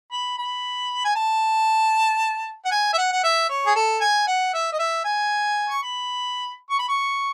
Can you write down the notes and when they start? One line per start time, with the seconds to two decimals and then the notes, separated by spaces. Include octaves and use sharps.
0.12 B5
0.38 B5
1.05 G#5
1.15 A5
2.65 F#5
2.71 G#5
2.93 E5
2.98 F#5
3.12 F#5
3.24 E5
3.50 C#5
3.66 G#4
3.76 A4
4.01 G#5
4.27 F#5
4.54 E5
4.73 D#5
4.79 E5
5.05 G#5
5.69 C#6
5.83 B5
6.70 C#6
6.79 B5
6.89 C#6